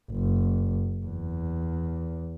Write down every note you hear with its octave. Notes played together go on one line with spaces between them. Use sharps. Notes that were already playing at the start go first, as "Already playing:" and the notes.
F#1
E2